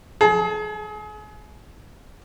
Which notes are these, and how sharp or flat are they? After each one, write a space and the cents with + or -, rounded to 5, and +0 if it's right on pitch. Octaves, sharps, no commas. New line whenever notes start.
G#4 +35 A5 +0